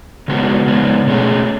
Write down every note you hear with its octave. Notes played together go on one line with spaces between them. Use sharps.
C#3 G#3 B3 F#4
C#3 G#3 B3
B2 A3 C#4 G#4